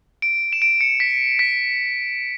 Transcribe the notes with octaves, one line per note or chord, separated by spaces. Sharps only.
D7
E7
D7
C#7
B6
B6